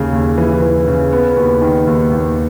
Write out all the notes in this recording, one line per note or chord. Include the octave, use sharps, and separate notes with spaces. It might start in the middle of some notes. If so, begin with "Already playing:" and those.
Already playing: D#2 C#3
D#2
E3
E3
C#3
B3
D#2
D#3
D#2
D#2